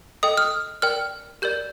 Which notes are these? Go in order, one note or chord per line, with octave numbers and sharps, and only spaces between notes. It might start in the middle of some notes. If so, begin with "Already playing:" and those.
A4 D#5 G5 D#6
F6
A#4 D5 G5 F6
G4 A#4 D5 G6